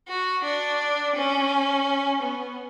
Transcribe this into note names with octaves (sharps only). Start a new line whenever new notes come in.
F#4
D4
C#4
B3